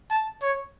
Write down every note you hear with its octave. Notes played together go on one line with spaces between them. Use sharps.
A5
C#5